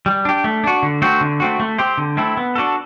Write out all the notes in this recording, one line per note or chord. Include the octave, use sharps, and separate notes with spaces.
G3
D4 G4
A3
D4 F#4
D3
A3 C4 F#4 C5
D3
A3 C4 F#4
A3
C4 G4 C5
D3
A3 C4 E4
B3
D4 F#4 A4